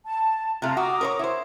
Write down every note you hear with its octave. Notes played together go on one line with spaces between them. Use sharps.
A5
C3 A3 F4 A#5
F#4 A#5 D6 D#6
A#4 C5 C#5
E4 C5